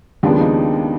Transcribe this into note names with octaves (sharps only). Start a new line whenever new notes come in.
D#2 C#3 F3 G#3 B3 D4
D#4